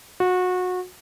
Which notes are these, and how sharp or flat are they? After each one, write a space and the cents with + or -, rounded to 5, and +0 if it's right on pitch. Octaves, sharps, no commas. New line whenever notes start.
F#4 -25